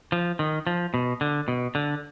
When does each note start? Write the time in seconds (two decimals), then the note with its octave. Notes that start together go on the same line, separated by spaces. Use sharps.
0.12 F3
0.39 D#3
0.67 F3
0.94 B2
1.21 D3
1.48 B2
1.75 D3